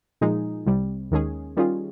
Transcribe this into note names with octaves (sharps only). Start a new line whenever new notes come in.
A#2 F3 G#3 D#4 G#4
C2 C3 G3
D#2 D#3 G#3 C#4 G#4
D#3 G3 C#4 F4 G#4